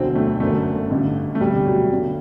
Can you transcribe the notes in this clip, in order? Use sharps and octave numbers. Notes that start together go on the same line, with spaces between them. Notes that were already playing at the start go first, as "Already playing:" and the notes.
Already playing: E1 D2 D3 F#3 C4
A3
G1 F#2 D3 F#3 A3
A1 G2 D3
A3
E1 D2 C3 G3
F#3
G1 G2 F#3